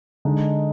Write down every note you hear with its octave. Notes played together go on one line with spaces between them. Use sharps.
D3 G#3 D#4